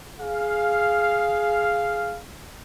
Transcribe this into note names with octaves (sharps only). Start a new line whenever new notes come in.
G#4 F5